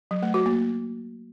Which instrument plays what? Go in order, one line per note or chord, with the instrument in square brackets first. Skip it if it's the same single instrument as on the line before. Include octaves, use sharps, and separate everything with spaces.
[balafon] F#3
A3
F#4
A#3